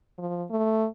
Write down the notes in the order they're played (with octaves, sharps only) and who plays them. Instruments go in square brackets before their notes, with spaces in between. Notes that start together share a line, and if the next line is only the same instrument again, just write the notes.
[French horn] F3
A3